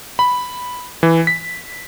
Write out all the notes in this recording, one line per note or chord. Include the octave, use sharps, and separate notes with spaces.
B5
E3
B6